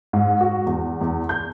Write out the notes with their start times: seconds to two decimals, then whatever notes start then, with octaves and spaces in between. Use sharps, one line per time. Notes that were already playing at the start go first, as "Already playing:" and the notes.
0.13 G#2
0.41 F#4
0.66 E2
1.01 E2
1.29 G6